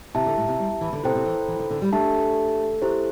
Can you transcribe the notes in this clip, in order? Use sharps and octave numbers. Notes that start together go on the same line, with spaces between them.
C3 E4 G4 E5 A5
D3
A2
C3
G3
E3
D3
C3 E4 A4 C5 G5
C3
E3
E3
D3
D3
G3
A3 D4 G4 E5 A5
E4 G4 C5